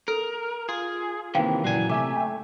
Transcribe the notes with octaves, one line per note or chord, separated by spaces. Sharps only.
A4 A#4
F4 G#4
C3 D#3 E3 A#3 F5 G5
F#1 A#2 E3 F#3 G#5
C3 A3 E5 G#5 D6
G5